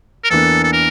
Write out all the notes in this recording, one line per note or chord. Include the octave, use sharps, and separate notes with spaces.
A#4
E2 E3 A#3 D4 A4
A4
A#4